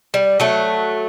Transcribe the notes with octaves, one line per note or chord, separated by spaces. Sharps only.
G3
F#3 A3